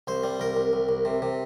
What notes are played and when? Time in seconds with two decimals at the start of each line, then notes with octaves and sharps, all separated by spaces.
0.07 C2 C5
0.23 G3
0.40 C2 A#4
0.57 C2
0.73 C2
0.89 C2
1.05 C3
1.22 C3